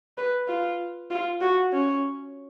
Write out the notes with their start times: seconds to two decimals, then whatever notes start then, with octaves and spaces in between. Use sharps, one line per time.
0.18 B4
0.48 F4
1.10 F4
1.41 F#4
1.73 C#4